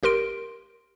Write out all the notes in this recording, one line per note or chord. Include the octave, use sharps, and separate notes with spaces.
G#1 G4 A#4 C6 D7